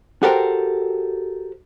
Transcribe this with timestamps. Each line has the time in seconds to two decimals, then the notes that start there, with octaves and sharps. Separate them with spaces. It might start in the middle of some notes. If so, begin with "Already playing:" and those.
0.23 F#4 G4 A4 A#4 C5 G5